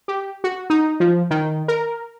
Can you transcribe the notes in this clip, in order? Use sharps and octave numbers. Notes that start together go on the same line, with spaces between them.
G4
F#4
D#4
F3
D#3
A#4